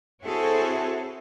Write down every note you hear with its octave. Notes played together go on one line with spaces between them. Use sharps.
C4 E4 F#4 G#4 A4 C#5